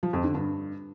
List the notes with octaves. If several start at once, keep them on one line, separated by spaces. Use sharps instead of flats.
F3
F2
D3
G2